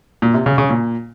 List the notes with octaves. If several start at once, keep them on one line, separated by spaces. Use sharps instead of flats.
A#2
C3
C#3
C#3
A#2